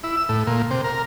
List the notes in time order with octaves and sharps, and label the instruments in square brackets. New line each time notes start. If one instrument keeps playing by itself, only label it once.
[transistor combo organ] E4
E6
A2
A#2
C3
A#4